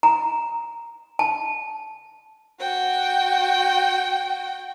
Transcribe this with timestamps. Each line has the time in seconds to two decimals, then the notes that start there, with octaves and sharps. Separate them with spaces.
0.03 A#5
1.19 A5
2.60 F#4 G5